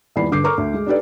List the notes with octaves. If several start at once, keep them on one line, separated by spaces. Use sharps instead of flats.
D#1 E2 D5 B5 C7
G2 D3 D6 G6 C7
A4 A#4 A#5 C#6 D6 F6
D2
G#3
D4 D#4 G4 A4 B4 D5